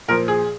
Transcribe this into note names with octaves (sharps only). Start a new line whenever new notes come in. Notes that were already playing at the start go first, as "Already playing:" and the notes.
A#2 F3 A#4
G#4